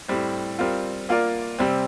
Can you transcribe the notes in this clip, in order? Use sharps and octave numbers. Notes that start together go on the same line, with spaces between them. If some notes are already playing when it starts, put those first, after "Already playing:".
A2 G3 C4
G3 C4 F4 A#4
A#3 F4 A#4 D5
C3 G3 C4